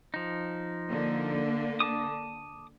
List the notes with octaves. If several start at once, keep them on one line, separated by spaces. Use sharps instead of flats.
F3 D#4
D3 A#3
A5 D6 D#6